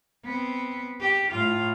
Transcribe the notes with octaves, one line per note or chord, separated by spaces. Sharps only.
B3 C4
G4
A2 F4